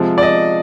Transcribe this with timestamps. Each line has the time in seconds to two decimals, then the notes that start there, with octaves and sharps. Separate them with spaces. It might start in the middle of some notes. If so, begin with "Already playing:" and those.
Already playing: C3 F3 G#3
0.18 D5
0.23 D#5